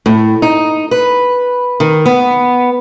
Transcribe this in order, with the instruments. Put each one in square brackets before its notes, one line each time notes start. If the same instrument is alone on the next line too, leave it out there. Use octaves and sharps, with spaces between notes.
[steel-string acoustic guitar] A2
D#4
B4
D#3
B3